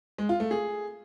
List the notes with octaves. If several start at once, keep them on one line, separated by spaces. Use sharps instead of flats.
G#3
F4
A3
G#4